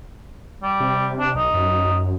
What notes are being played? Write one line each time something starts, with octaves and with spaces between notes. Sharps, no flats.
G3
C3
D4
B1 D#4
F#2